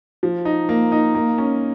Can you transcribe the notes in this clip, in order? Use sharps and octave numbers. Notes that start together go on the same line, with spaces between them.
F3
D#4
A#3
D#4
A#3
C#4